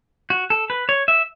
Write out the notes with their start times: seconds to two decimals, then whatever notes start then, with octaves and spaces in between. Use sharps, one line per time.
0.30 F#4
0.50 A4
0.70 B4
0.89 C#5
1.08 E5